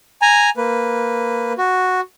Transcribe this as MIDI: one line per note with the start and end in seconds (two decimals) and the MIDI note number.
0.22 0.50 80
0.22 0.50 82
0.57 1.53 58
0.57 1.53 71
1.58 2.01 66